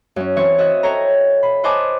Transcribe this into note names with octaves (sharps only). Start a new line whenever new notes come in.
F#2 C#4
E3 C4 C#5
F#4 D#5 E5 F#6
A4 C#5 G5 A#5
B5
B4 C5 D#5 G#5 A5 D6